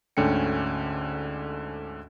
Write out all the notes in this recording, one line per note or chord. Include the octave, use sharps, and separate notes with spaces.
D2 G#2 D3 C#4 G5 C#7